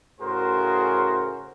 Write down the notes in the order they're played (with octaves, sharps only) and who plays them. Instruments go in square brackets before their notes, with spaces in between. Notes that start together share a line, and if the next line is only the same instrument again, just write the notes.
[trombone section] A2 C#3 F#4 G#4 A#4 C5